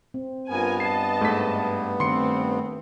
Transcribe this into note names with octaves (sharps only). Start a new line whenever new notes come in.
C4
G2 B3 F4 A#4 G#5
D#5 A5 C7
G#2 A3 B6
D#3 A3 C4 C6 C#7